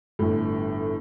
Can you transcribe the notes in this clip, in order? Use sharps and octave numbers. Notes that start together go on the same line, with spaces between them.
G1 A2